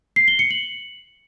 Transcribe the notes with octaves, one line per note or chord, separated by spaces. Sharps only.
C7
G7
C#7
F#7